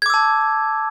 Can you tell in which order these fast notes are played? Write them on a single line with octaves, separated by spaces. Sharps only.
G#6 D6 E6 A5